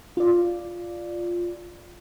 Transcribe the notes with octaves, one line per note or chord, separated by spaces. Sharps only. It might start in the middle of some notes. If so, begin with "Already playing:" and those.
F4 D5